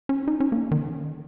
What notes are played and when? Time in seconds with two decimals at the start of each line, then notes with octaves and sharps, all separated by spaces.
0.09 C#4
0.28 D#4
0.40 C#4
0.52 A#3
0.71 D#3